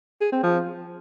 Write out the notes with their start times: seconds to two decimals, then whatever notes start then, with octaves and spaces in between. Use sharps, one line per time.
0.21 G#4
0.32 C4
0.43 F3